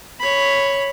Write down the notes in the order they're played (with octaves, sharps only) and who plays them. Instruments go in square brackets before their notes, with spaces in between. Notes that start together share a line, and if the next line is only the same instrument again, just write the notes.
[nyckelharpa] C#5 B5